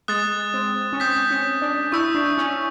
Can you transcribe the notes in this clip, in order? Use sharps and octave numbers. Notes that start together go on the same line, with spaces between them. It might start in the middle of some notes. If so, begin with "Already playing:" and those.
G#3 D#6 F#6 A6
C4
C#4
C4 D#6 G6 B6
C#4
D4
E4 C#6 E6 G6
D4
C#4